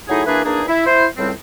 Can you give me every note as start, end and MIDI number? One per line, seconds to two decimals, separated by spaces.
0.09 0.22 54
0.09 0.22 57
0.09 0.22 63
0.09 0.22 64
0.09 0.22 68
0.26 0.42 52
0.26 0.42 58
0.26 0.42 62
0.26 0.42 64
0.26 0.42 68
0.26 0.42 71
0.45 0.62 40
0.45 0.62 58
0.45 0.62 62
0.45 0.62 63
0.45 0.62 68
0.68 0.83 64
0.86 1.06 64
0.86 1.06 72
1.17 1.31 37
1.17 1.31 45
1.17 1.31 55
1.17 1.31 60